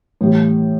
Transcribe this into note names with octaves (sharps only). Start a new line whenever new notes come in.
A2 E3 G3